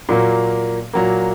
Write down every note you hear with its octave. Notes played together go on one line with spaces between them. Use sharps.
A#2 F#3 A#3
A#2 F#3 A#3